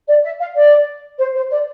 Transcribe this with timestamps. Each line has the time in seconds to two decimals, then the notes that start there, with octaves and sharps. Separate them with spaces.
0.08 D5
0.24 E5
0.40 F5
0.56 D5
1.19 C5
1.35 C5
1.51 D5